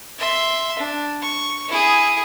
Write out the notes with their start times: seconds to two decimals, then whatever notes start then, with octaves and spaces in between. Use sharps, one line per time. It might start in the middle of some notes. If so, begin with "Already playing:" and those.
0.19 E5 C6
0.79 D4
1.22 C#6
1.68 E4 G#4